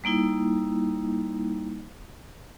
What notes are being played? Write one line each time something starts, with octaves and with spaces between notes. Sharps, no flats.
G3 A#3 D#4 E4